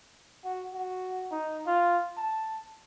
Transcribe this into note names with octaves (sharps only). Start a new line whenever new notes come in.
F#4
F#4
D#4
F4
A5